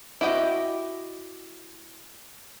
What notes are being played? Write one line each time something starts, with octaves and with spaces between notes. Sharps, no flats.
E4 F#4 G4 D#5